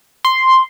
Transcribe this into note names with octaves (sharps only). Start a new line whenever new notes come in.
C6